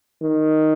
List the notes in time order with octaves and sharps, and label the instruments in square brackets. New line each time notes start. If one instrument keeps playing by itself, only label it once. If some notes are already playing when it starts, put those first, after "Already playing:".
[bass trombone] D#3